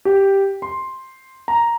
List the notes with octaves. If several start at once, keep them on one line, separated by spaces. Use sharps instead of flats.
G4
C6
A#5